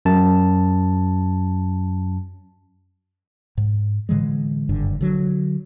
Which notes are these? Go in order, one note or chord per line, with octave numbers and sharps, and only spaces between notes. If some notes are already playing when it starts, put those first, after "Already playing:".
F#2 A5
G#2
A2 D3 E3 G#3
F#1 G2 D3
D3 F#3